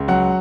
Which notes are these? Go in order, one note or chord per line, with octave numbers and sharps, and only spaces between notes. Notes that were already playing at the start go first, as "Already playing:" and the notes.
Already playing: C#2
F#3 F#5